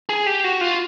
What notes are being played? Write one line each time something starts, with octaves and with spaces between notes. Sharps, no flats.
G#4
G4
F#4
F4